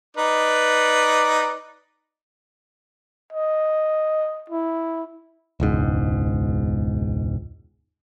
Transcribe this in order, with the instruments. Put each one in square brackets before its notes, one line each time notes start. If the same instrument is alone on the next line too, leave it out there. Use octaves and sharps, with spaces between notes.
[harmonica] D#4 B4 D5
[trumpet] D#5
E4
[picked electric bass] E1 C#2 G#2